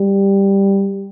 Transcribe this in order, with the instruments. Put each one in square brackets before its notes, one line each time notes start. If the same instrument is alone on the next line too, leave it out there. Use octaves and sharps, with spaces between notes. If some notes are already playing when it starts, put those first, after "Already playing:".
Already playing: [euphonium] G3